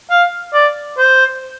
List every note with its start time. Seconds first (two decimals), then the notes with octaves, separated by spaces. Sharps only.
0.10 F5
0.53 D5
0.98 C5